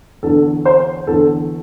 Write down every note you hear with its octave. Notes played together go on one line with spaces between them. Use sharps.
E2 D3 A4
C5
E2 D3 A4